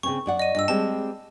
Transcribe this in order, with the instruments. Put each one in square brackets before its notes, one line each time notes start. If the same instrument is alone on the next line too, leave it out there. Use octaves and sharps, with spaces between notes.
[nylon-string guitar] C#3 C4 C#4 [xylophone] C#6
[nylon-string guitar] F#2 D5 F#5
[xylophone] D#5 D#7
[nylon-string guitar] G2 F4 [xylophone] D#5 E6
[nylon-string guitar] G3 G#3 C4 [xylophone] A5